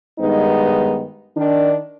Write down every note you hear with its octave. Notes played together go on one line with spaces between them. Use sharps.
G2 D#3 G#3 B3 D#4
D#3 D4